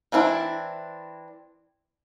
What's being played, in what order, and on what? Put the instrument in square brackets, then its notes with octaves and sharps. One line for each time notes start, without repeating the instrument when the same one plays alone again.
[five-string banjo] E3 C4 D4 E4